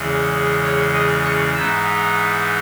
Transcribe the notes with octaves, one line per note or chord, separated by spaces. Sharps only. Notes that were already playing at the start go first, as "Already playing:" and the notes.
Already playing: E2 C#3 G#3
C#5
D#5
C#6
G#2 E3 B3 D#4 E6